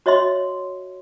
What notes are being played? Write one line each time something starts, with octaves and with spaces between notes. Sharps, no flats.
F#4 C#5 D#5 E5 C6